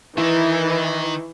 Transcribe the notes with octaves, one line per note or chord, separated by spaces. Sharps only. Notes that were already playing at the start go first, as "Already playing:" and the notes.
D#3 E3 D#4 E4